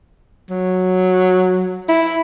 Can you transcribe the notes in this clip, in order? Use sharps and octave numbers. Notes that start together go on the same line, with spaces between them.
F#3
E4